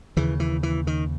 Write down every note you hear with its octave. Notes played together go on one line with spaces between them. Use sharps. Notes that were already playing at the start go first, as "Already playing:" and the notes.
D#2 C#3 E3
E3
E3
D#3